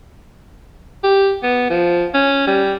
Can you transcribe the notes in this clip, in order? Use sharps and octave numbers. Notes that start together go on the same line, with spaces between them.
G4
B3
F3
C#4
G3